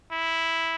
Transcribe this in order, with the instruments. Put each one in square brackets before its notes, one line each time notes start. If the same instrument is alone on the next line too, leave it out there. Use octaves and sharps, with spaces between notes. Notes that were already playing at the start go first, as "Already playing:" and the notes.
[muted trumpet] E4